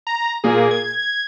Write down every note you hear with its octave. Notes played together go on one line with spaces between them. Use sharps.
A#5
A#2 A#3 G#4
G#6